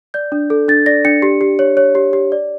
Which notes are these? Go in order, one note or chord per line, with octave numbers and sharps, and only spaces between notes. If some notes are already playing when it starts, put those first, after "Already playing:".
D5 G6
D4
A4
D4 A6
D5 A#6
D4 C#7
G4
G4
C#5
C#5
G4
G4
D5